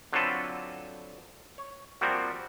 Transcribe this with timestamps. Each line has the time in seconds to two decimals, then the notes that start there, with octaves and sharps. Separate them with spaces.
0.13 D3 F#3 C4 F4 A4 B4
1.58 C#5
2.01 F3 G3 A#3 C4 F#4